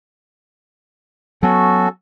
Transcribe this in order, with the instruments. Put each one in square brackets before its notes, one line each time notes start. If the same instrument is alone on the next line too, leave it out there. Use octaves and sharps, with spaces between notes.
[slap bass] F#3 B3 [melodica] C#4 F#4 A4